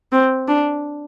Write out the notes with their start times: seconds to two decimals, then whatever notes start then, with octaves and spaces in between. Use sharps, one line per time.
0.12 C4
0.48 D4